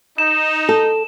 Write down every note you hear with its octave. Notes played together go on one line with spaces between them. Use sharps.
D#4 E7
A4